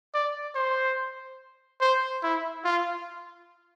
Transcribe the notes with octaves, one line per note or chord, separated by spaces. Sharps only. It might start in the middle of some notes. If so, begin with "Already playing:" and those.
D5
C5
C5
E4
F4